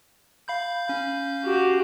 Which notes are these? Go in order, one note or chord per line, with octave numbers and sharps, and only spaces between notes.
F5 B5 G6
C#4 F5 G6
F#4 G4